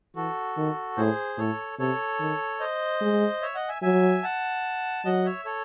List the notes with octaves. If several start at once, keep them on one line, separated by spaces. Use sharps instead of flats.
E3 F#4 A4
D#3
A2 G#4 C5
A2 A4 C#5
C3 A4 C#5
D#3
C5 D#5
G#3
C#5 E5
D#5 F#5
E5 G#5
F#3 E5 G#5
F#5 A5
F#3 D#5 F#5
C#5 E5
A4 C#5